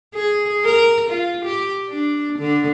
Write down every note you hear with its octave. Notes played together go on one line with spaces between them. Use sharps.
G#4
A#4
F4
G4
D4
D3